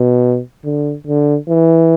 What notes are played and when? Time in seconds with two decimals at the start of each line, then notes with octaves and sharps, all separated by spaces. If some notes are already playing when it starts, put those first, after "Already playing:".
Already playing: B2
0.65 D3
1.07 D3
1.49 E3